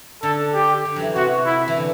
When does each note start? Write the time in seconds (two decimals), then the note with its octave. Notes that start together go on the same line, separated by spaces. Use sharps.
0.23 D3 A4
0.54 G4
0.85 D3
0.96 E3 F#3
1.15 C3 F#4
1.45 E4
1.68 E3
1.77 D3